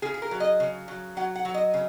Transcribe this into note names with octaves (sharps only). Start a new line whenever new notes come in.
C#3 G#4
G#4
A#4
F#3
D#5
C#3
F#3
F#3 F#5
F#5
F#3
D#5
C#3